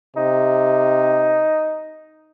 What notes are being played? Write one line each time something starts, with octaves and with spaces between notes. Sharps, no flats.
C3 D#4